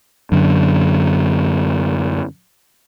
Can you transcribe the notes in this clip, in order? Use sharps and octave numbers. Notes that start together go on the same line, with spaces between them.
F#2 D3